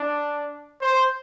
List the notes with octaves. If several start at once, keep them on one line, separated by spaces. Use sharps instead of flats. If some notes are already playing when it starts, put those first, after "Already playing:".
Already playing: D4
C5